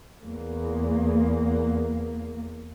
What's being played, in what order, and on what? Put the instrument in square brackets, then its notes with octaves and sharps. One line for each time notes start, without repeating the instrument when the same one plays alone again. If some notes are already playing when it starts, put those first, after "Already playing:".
[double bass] E2 A#3